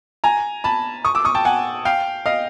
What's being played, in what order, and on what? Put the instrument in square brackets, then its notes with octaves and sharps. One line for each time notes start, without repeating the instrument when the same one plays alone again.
[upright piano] G#5 A#5
A5 B5
C#6 D#6
D6 E6
C#6 D#6
G5 A5
F#5 G#5
F5 G5
D#5 F5